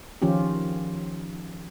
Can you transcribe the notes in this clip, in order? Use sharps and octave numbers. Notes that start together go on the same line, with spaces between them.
D#3 F3 C#4 F4 G4